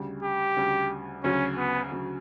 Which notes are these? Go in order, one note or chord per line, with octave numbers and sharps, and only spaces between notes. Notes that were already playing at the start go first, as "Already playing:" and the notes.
Already playing: D2 C#3 G3
G4
D2 C#3 G3
D2 C#3 F#3 C#4
B3
D2 C#3 F#3